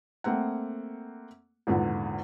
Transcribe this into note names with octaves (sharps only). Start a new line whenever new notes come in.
A3 A#3 C4 F#5
G#1 E2 A#2 D3